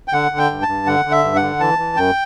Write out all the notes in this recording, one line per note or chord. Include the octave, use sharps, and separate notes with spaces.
G5
D3 F#5
D3
G5
G2
A5
G2
D3 F#5
D3
E5
G2
F#5
D3
E3 A5
E3
F#2 G5